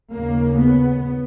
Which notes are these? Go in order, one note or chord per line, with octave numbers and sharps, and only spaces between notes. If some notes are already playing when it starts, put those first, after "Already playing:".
D#2 C#3 A#3
B3